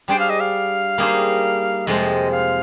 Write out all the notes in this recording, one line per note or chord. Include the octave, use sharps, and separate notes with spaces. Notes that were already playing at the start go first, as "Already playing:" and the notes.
G3 D4 G#4 C5 G5
F5
D#5
F5
G3 A#3 D#4 G#4 C5
F2 C3 F3 G#3 D#5
F5